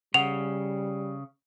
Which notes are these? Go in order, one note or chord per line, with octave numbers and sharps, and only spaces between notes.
C#3 G3 F#5 F7